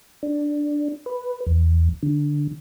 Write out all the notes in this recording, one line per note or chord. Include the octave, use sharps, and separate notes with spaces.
D4
B4
E2
D3